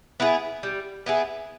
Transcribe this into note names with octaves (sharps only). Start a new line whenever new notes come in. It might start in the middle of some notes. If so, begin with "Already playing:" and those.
B3 E4 G#4
G3
B3 E4 G#4